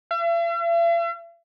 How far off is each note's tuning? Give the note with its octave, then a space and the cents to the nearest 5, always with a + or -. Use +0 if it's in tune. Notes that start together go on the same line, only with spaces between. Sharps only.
E5 +45